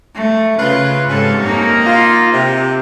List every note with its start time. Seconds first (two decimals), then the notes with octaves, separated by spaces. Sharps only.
0.15 A3
0.59 C#3 F4 B4
1.10 F2 G#2 C3 C#4 A4
1.42 A#3 D#4
1.86 F4
2.32 C3